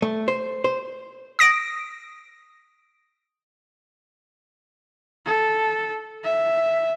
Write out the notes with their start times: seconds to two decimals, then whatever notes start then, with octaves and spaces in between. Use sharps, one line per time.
0.02 A3
0.28 C5
0.64 C5
1.39 D#6 A#6 D7
5.26 A4
6.24 E5